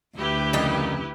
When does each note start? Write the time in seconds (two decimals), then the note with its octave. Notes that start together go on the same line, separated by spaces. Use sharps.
0.17 D2 E4 G4 B4
0.53 F2 C#3 G3 A#3 D#4